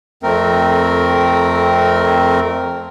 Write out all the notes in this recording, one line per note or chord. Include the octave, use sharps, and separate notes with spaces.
F2 A3 C4 A#4